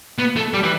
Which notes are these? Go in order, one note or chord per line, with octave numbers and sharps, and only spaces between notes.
B3
A3
G3
E3